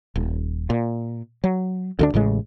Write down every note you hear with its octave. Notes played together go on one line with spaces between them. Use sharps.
D#1
A#2
F#3
D2 D3 D4
A1 A2 C#3 G#3